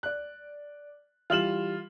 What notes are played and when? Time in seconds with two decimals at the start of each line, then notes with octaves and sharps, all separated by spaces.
0.03 D5 F#6
1.30 E3 G3 F4 F6 E7 F#7